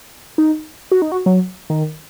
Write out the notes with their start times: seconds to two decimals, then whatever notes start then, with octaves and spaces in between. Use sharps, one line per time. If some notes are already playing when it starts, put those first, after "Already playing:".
0.38 D#4
0.92 F#4
1.02 D#4
1.12 F#4
1.26 F#3
1.70 D#3